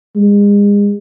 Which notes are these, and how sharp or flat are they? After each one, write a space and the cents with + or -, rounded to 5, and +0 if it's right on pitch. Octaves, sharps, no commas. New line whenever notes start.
G#3 -35